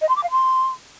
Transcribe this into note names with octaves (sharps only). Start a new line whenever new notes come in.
D#5
C6
D6
F5
C6